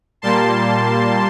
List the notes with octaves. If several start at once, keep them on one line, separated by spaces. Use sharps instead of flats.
A#2 G3 A#3 A5 C6